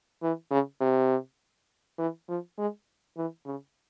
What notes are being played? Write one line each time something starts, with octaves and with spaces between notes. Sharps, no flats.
E3
C#3
C3
E3
F3
G#3
E3
C#3